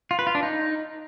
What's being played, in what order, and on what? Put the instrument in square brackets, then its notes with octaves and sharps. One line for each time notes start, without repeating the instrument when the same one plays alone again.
[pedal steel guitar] F4
B4
F4
D4
D#4